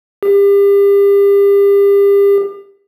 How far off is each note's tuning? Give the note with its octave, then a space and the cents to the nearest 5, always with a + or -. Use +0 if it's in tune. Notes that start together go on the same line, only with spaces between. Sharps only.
G4 +35